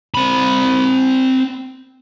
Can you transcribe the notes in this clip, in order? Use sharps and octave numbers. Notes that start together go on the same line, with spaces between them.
C4 B5